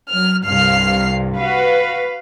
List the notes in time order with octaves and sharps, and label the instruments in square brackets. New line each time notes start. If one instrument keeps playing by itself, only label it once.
[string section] F#3 [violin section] F6
[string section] C2 G2 [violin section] F5 F6 C7
[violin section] F#4 [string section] B4 F5